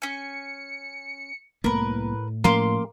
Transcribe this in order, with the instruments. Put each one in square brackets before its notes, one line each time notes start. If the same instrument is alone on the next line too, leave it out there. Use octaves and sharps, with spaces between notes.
[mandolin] C#4 G#5 [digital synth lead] C#7
[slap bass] C2 A#3 B3 [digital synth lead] A2 [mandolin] A#4 B4
[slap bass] F3 A3 C#4 [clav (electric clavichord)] A#3 [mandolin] F5 C6 D6